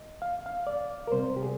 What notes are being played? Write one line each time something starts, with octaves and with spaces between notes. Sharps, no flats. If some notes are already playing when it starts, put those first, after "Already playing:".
Already playing: D#5
F5
F5
D5
A#4
C3 G3 C4 C5
G4
G#4